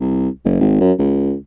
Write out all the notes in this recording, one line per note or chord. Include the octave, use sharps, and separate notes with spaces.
C2
F#1
G#1
F#2
C#2